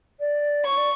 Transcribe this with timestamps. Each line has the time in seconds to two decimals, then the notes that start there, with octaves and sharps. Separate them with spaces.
0.20 D5
0.65 C#5 C#6
0.77 D5